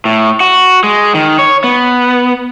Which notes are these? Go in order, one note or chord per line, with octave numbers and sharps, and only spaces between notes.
A2
F#4
G#3
D#3
C#5
B3